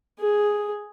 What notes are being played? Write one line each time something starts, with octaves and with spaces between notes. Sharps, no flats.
G#4